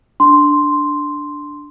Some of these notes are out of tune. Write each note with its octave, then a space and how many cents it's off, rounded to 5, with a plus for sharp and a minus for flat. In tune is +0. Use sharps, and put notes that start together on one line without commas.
D4 +0 C6 +0